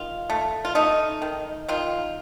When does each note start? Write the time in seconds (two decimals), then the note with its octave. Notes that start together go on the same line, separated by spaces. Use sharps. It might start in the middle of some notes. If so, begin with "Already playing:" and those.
Already playing: D#3 F4
0.30 A3
0.65 F4
0.75 A3 D#4
1.22 D#3
1.68 D#3 F4